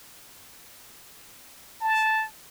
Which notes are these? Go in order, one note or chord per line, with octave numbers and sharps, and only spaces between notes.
A5